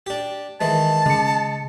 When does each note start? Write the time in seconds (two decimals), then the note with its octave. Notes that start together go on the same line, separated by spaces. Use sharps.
0.06 D4 G4
0.61 D#3 E3 G#3 A5
1.06 C#3 G#3 C#7